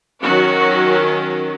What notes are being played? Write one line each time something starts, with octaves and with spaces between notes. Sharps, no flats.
D#3 F#3 C#4 F#4